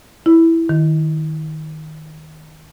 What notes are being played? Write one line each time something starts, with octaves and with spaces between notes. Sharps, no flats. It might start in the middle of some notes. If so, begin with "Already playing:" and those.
E4
D#3